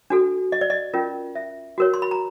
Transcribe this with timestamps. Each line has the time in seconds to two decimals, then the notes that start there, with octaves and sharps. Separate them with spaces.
0.10 D4 F#4 A4
0.52 D#5
0.61 D5
0.70 D#5
0.94 C#4 F4 A#4
1.35 E5
1.78 F#4 A#4 C#5
1.94 C6
2.02 B5
2.11 A#5